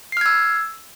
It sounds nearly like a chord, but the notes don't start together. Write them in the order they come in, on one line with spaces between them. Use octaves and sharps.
C7 F6 G#6 E6